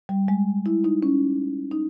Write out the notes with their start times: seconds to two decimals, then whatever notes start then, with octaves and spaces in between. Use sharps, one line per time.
0.09 G3
0.28 G#3
0.66 E4
0.84 D#4
1.03 C#4
1.71 D#4